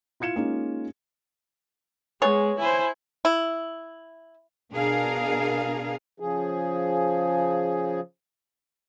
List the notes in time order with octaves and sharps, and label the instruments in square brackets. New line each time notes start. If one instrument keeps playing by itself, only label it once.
[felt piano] E4 F4 G#6 C#7 E7
G#3 A#3 C#4 D#4 F4
[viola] G#3 [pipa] B3 G#4 C#5
[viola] E4 [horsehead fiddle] C5 G#5
[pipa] E4
[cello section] B2 D4 G#4 A#4 F5
[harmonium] C#3 F3 G#4